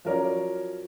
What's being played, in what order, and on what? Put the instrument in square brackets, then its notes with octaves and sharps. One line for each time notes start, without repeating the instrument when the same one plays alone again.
[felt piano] F3 F#3 C#4 A#4 C#5 D5